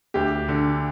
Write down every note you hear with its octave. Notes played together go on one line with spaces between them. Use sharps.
D2 G4
D3